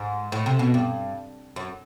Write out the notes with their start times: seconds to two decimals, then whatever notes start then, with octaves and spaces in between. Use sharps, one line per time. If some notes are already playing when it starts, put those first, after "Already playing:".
Already playing: G#2
0.32 A2
0.46 C3
0.59 B2
0.74 G2
1.56 F#2